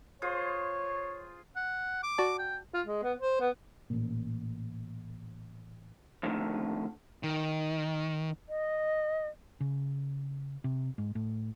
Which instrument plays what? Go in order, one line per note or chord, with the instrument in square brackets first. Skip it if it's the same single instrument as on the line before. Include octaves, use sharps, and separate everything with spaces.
[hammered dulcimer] F4 G#4 C5 [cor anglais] C#5
[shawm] F#5
D6
[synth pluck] F#4 D5 A5
[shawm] G5
[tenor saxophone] F4
G#3
B3
C5
B3
[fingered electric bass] A1 A#2
[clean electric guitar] F2 A2 D3 D#3
[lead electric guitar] D#3
[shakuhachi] D#5
[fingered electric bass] C#3
C3
G#2
A2